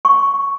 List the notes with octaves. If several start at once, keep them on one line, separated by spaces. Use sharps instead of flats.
C#6